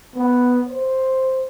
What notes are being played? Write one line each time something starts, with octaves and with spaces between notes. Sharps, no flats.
B3
C5